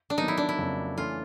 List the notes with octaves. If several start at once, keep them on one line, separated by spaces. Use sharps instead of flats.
D4
D#3 F#3 B3 D#4
E4
D4
E4
F2 C#3 F#3 A#3
E3 A3 C#4 F4